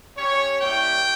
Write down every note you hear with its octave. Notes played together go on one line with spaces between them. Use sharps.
C#4 G4 C#5
G3 A#3 E4 G4 G5